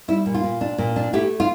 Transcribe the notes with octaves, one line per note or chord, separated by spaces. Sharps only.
G3 E4
A#2
F4
A#2
D4
A#2
D4
A3 E4 G4
F4